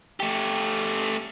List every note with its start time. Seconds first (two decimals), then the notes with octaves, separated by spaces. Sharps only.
0.20 A3 G4